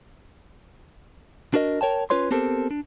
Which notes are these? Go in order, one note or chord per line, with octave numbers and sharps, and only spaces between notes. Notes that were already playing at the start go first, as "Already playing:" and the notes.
D4 F#4 A#4 D#5
A#4 C#5 G5 A5
C#4 F4 B4 C#5 C6
B3 C4 G4 A4 A#4 C5
D4